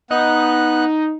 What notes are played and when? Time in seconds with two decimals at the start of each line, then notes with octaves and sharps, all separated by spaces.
0.11 B3 D#4 F#6